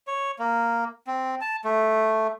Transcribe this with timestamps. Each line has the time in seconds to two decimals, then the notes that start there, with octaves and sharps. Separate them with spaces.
0.07 C#5
0.39 A#3
1.07 C4
1.41 A5
1.65 A3